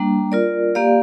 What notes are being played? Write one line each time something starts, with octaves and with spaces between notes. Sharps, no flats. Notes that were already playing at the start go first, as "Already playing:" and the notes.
Already playing: G3 A#3 D4
F4 A#4 D5
A#3 G4 D5 F5